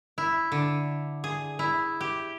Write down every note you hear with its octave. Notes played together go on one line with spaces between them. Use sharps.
E4
D3
G#4
E4
G4